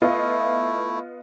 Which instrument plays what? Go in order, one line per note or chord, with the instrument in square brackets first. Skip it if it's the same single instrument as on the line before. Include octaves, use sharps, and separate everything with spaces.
[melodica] A3 E4 [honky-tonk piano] B3 F4 D#5